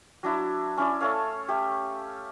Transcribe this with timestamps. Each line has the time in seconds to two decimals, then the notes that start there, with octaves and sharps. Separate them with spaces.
0.23 F#3 D4 E4
0.77 C#4 E4 D5
1.00 A3 A4 C#5 F5
1.48 A3 G4